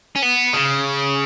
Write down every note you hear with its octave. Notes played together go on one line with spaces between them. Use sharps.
C#4
B3
C#3